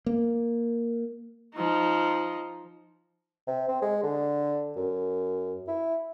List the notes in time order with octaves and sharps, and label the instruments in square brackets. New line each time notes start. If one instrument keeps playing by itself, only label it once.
[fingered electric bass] A#3
[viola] F3 D#4
[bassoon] C3
C4
G#3
D3
F#2
E4